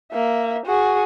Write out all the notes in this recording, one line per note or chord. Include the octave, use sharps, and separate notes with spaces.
A#3 E5
F#4 G#4